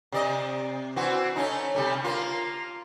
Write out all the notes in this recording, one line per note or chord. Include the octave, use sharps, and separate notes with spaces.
C3 D5 D#5
E3 C4 F#4
A3 C#4 D#4
C3 G3 A3
A#3 F4